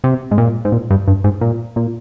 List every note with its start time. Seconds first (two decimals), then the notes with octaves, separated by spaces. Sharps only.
0.04 C3
0.31 G#2
0.38 A#2
0.65 G#2
0.72 A#2
0.91 G2
1.08 G2
1.24 G#2
1.41 A#2
1.76 A#2